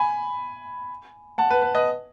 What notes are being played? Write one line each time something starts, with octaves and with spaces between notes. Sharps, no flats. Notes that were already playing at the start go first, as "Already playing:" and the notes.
Already playing: G#5 B5
F#5 A5
B4
B4
B4 D#5